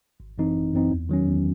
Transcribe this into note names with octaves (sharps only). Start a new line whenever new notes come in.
G#1
F#2 E3 C4 D#4
G#1
F#2 E3 C4 D#4
E2
D#3 F#3 C#4
E2